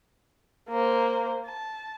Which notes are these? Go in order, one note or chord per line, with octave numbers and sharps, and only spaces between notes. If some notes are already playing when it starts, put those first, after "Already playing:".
A#3 C5
A5